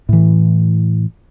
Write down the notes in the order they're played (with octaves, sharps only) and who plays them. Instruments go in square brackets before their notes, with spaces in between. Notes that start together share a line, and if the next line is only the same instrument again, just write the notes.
[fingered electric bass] A2 E3